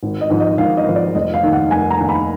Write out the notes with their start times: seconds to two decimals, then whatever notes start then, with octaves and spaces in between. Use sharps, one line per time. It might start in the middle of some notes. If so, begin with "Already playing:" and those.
0.03 G#1
0.21 D#5
0.30 G#2 F3
0.40 D#5
0.58 G#1 F5
0.77 D#5
0.87 G#2 F3
0.96 D5
1.15 F1 D#5
1.34 F5
1.43 D#2 D#3
1.52 F#5
1.71 F1 G#5
1.90 A#5
1.99 D#2 D#3
2.09 B5